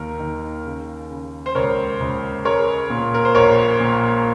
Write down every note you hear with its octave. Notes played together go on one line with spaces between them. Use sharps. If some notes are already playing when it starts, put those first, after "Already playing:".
Already playing: D#2 D#3 A#4
D#3
C#3
C#3
C5
C#2 A#4 C#5
C#2
G#3 A#4 C#5
A#2
A#4
C5
A#1 A#4 C#5
A#2